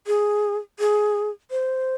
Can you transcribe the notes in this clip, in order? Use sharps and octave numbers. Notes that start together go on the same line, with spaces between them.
G#4
G#4
C5